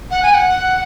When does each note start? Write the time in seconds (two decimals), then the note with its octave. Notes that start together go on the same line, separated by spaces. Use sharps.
0.11 F#5
0.23 G#5
0.34 F#5